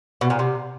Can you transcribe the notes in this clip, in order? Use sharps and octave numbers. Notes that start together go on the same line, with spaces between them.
B2
A#2
C3